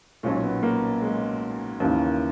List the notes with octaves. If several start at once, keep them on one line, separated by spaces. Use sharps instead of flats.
B1 A#2 C#4
B3
A#3
G#3
D#2 C#3 E3 A#3